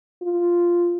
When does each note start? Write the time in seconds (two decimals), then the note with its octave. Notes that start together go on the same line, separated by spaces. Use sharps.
0.22 F4